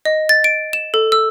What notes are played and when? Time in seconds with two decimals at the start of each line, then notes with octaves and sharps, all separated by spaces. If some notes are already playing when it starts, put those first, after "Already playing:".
0.05 D#5
0.29 A6
0.44 D7
0.73 E7
0.94 A4
1.12 E6